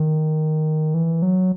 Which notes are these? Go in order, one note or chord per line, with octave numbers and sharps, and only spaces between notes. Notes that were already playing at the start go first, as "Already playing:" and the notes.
Already playing: D#3
E3
F#3